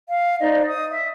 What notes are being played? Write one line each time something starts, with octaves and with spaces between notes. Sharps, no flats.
F5
D#4 C5 D5 D#5
D#6
E5